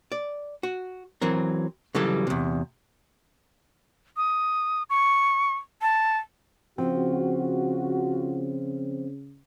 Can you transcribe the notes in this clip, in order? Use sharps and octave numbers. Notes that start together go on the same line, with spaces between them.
D5
F#4
E3 F#3 C4 A#4
C#3 E3 F#3 G3 A4
E2 C3
D#6
C#6
A5
C#3 F3 C4 F4 F#4